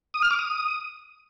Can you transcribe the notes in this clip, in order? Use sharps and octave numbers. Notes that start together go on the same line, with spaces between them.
D#6
F6
D6
D#6